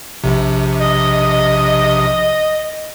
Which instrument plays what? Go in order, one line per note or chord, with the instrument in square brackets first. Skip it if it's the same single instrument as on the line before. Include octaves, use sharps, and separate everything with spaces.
[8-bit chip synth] A#1 C3
[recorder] D#5